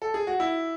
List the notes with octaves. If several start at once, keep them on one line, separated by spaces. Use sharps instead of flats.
A4
G#4
F#4
E4